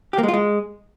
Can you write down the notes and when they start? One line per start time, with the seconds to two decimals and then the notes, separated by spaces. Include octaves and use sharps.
0.13 G4
0.18 A#3
0.23 G#3
0.28 F4
0.33 G#3